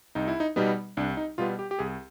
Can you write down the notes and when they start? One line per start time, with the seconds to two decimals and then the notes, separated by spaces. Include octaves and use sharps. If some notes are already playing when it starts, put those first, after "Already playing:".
0.15 C2 D#4
0.28 E4
0.40 D#4
0.56 B2 G3 B3 D#4
0.97 C2 D4
1.17 D#4
1.38 B2 G3 B3 F4
1.59 G4
1.71 G4
1.79 C2 G#4